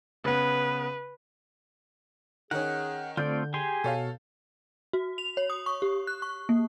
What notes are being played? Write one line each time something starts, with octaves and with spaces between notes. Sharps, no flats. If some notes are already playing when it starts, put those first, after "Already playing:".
C#3 B3 B4
D#3 C#4 G#4 F#5
D3 A3 C4 F4 D5 G6
G4 G#4 G#5 C6
B2 A4 C#5 F5
F#4
F7
C#5
D#6
C#6
G4
F#6
C#6
A#3